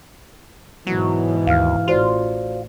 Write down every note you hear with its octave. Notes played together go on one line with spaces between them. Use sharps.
G#2 B2 E3 F#3
D#2 F5 F6
A1 F4 F#4 C5 D5